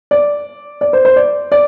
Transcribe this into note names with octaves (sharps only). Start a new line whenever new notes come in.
D5
D5
C5
C5
D5
D5